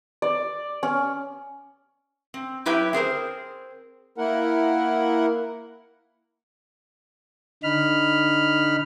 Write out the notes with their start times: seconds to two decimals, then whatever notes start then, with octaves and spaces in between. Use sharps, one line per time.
0.22 D5
0.83 C#4
2.34 C4
2.66 F#3 E4 G4 B4 E5 G5
2.93 C4 G#4 A#4 C5
4.18 A#3 E4 A#4 F#5
7.64 D3 D#4 B5 F6